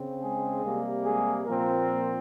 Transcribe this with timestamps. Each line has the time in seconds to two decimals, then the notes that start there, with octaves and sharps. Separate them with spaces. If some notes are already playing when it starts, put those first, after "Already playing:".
Already playing: C#3 C4
0.22 G#3 G#4
0.64 C3 G3 A#3
1.05 G#3 G#4
1.46 A#2 F3 A#3 C4 A#4